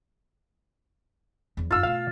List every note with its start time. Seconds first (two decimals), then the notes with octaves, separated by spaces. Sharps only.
1.57 E2 F3
1.71 F#2 D#4 F4 E6
1.83 B2 A3 F5